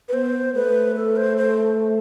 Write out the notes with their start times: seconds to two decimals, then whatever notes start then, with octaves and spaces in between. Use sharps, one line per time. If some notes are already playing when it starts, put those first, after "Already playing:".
0.09 B4
0.13 B3 C5
0.55 A3 B4
0.96 A4
1.16 C5
1.37 C5